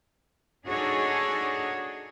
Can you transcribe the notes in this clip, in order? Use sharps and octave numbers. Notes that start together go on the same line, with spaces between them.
D4 D#4 F#4 G#4 A4 C#5